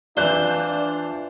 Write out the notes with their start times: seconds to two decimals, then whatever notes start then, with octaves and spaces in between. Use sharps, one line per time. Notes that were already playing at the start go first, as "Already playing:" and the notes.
0.17 E3 D4 F4 C5 D5 F#6 G6